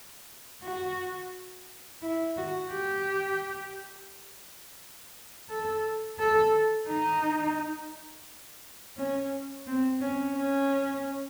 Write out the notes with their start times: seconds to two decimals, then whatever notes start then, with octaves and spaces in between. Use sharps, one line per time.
0.63 F#4
2.02 E4
2.37 F#4
2.71 G4
5.49 A4
6.19 A4
6.88 D#4
8.97 C#4
9.67 C4
10.01 C#4
10.36 C#4